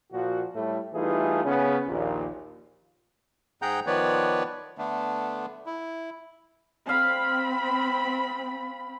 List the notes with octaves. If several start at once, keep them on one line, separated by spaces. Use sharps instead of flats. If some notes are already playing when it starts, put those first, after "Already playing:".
A#2 F3 F#4
A2 G3 A3
E3 G3 A3 D#4 F4 G#4
C#3 B3 C#4
A#1 D#2 A#2
G#2 G#4 F#5 G5 A#5 G6
D#3 F3 B3 B4 C#5 D5
D3 A3 B3 D4
E4
C4 F5 B5